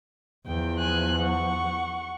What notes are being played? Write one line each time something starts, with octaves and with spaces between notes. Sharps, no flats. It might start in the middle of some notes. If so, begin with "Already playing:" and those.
E2 F3 G5
G#5 F#6
F#5 C#6